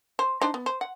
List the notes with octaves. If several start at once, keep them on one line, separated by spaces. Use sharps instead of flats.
C5
D4 D#4 C5
B3
C5
F#5